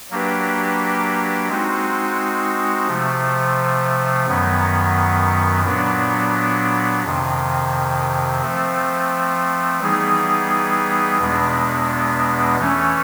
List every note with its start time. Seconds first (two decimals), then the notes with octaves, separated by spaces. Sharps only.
0.11 F#3 A#3 D4 G4 B4
1.49 G#3 C4 D#4 F#4
2.87 C3 F3 A3
4.26 F#2 D#3 F#3 B3
5.64 A#2 F#3 B3 D4
7.03 F2 C3 D#3
8.41 F3 A3 C4
9.80 E3 G3 B3 D#4 G#4
11.18 E2 B2 G#3 B3 D4
12.57 E3 A3 C#4